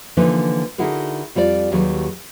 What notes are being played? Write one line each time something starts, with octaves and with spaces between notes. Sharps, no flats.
D3 E3 F3 A#3 D#4 B4
D3 D#4 E4 F#4 G#4 A#4
F2 G3 F4 A4 D5
D#2 D#3 F#3 G4 G#4 B4